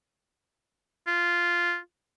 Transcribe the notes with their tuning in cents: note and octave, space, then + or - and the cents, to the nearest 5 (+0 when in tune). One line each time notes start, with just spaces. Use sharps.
F4 -5